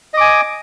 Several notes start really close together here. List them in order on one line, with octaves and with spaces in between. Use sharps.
D#5 D6 G#5